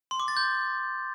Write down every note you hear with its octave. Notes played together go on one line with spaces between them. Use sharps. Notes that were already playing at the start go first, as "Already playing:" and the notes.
C6
D6
A6
G6